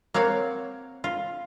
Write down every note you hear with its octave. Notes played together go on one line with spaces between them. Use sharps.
A#3 C4 C#5 F5 F#5
F4